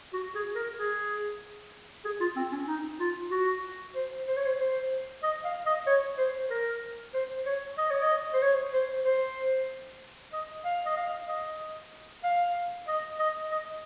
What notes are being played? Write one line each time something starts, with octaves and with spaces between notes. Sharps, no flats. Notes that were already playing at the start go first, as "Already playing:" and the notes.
F#4
G#4
A#4
G#4
G#4
F4
C4
C#4
D#4
F4
F#4
C5
C5
C#5
C5
C5
D#5
F5
D#5
C#5
C5
A#4
C5
C#5
D#5
C#5
D#5
C5
C#5
C5
C5
D#5
F5
D#5
F5
D#5
F5
D#5
D#5
D#5